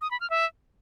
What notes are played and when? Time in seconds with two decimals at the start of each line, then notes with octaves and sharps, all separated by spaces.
0.01 D#6
0.11 B5
0.20 F6
0.30 E5